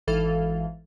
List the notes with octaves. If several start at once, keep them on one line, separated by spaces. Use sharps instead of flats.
G#1 E3 A4 F5